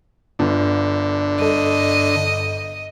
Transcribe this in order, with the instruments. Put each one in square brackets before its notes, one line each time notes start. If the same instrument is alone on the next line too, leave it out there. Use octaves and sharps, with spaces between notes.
[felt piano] G1 F4 [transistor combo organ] D3
[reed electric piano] G2 A4 [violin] D#5